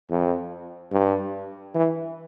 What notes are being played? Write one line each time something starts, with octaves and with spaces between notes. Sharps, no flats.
F2
G2
E3